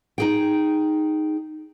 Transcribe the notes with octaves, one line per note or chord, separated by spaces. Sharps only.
D#4 G#4 G5